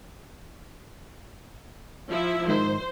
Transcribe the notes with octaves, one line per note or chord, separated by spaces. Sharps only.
F3 E4 E5
G#2 D#3 D#4 C5